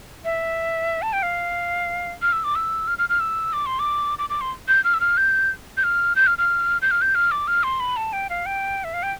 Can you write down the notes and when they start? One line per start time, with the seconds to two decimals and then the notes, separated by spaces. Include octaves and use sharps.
0.25 E5
1.02 A5
1.13 G5
1.23 F5
2.22 F6
2.33 E6
2.44 D6
2.55 E6
2.88 F6
2.99 F6
3.09 F6
3.20 E6
3.53 D6
3.66 C6
3.79 D6
4.19 D6
4.30 D6
4.41 C6
4.68 G6
4.84 F6
4.94 E6
5.01 F6
5.17 G6
5.77 G6
5.84 F6
6.16 G6
6.27 F6
6.38 F6
6.82 G6
6.91 F6
7.02 G6
7.15 F6
7.31 D6
7.48 F6
7.63 C6
7.80 B5
7.97 A5
8.13 G5
8.30 F5
8.46 G5
8.84 E5
8.94 F5
9.03 G5